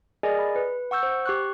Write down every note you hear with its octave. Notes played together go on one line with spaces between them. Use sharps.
G#4 A#4 D5 D#5 G#5
B5
B4
F#5 C#6 E6 G6
C5
G4 C#6 F#6